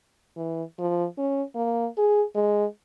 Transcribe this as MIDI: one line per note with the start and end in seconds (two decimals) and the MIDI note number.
0.36 0.63 52
0.79 1.05 53
1.18 1.43 61
1.55 1.87 58
1.98 2.23 68
2.35 2.65 56